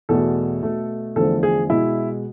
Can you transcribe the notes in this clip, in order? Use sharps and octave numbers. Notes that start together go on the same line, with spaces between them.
E2 B2 A3 A4
B2 A3
E2 D3 F3 A3 A4
G#4
B2 G#3 E4